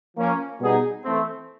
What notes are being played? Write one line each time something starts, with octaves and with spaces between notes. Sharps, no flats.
F3 A#3 C#4
B2 G3 B3 D#4 G#4
E3 A3 C4